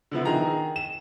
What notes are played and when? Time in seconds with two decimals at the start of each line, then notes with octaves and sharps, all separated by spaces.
0.11 D3 F3 B3 E4
0.25 D#3 G#4 A#5
0.76 E7